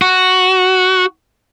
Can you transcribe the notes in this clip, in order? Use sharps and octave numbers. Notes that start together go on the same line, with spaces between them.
F#4